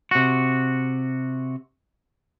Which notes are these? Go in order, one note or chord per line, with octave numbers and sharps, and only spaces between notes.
C3 F#4